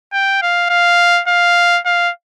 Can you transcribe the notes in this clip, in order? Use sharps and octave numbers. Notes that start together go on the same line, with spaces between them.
G5
F5
F5
F5
F5